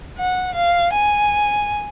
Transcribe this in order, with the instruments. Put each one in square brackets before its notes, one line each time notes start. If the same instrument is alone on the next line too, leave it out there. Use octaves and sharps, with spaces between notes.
[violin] F#5
F5
G#5